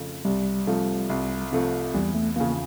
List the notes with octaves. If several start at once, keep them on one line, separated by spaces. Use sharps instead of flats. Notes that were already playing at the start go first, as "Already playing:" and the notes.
Already playing: F2 C#3 F3 A3
C2 G3
C3 F3 A3
C2
C3 F3 A3
E2 G3
A3
C#3 F3 A#3